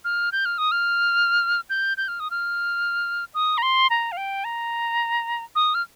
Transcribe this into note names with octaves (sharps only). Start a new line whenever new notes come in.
F6
G6
F6
D#6
F6
G6
G6
F6
D#6
F6
D#6
A#5
C6
A#5
F5
G5
A#5
D#6
F6